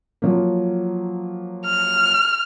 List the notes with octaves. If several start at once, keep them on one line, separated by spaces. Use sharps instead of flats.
F3 F#3 A#3
F6